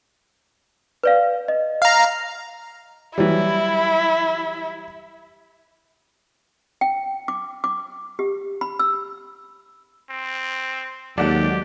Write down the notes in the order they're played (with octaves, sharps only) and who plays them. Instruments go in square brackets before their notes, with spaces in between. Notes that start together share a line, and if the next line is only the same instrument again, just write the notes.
[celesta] B4 D5 F5
D#5
[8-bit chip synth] F5 A#5
[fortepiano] E3 F#3 G3 [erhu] E4
[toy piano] G5
D6
D6
G4
B5
E6
[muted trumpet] C4
[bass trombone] D#2 [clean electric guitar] F#3 G#3 A4 [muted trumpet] G4 [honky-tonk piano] D5 F#5